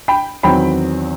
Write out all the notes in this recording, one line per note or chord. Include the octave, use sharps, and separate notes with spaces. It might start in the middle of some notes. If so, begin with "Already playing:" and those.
G5 B5
E2 D#3 F#3 C4 G5 B5